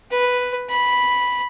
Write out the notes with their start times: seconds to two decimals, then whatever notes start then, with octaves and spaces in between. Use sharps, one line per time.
0.11 B4
0.70 B5